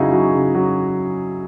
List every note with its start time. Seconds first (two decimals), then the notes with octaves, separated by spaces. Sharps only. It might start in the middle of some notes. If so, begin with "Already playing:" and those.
Already playing: C#3 F#3 D#4 E4 F#4 G#4
0.12 F#3
0.34 C#3
0.55 F#3